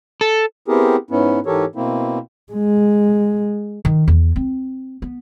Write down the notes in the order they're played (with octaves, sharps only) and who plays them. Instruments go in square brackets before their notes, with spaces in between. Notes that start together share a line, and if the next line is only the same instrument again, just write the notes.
[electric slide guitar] A4
[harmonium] B3 C4 E4 G4 G#4 A#4
G#2 B3 C#4 E4
G#2 E3 G4 A4 A#4 C#5
B2 A#3 C4 E4
[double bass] G#3
[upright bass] D#3
E2
C4
B3